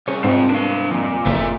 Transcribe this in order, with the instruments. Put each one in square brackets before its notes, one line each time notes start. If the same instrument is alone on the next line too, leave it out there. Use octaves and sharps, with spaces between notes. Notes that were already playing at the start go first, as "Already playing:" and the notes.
[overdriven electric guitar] C2 [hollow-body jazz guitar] C#4 G#4 C#5
[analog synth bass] G#2 [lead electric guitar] C4 F4
[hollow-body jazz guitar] B3 [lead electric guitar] D4 F5
[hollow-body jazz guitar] F2 F3 [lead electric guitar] A#2
[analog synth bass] F#1 [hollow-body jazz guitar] F2 A2 F4 [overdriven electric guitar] A3 E4